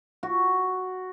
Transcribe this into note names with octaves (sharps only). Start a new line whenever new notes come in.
F#4